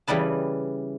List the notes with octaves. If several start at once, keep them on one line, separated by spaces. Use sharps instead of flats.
C#3 E3 G3 B4 A5